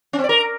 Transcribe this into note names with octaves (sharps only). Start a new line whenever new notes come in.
C#4
C4
D5
A#4